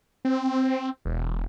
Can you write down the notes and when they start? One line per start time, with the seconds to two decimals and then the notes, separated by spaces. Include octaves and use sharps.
0.25 C4
1.05 E1